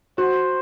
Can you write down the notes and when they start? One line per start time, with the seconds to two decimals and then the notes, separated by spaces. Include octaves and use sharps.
0.18 F#4 C5